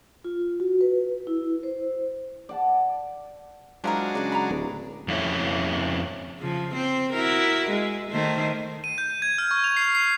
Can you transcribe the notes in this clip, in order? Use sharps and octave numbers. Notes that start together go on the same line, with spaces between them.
F4
F#4
B4
E4
C5
D5 F#5 A5
F3 F#3 G#3 D4 E4 A#4
C#3 D5 F#5
A#5 B5
D1
F2 C#4 E4 C#5
C#3 F3
C4 C5
E4 F#4 A#4
G#3
D#3 A3 C5
D#7
G6
G#6
F6
C#6
F7
C7
C7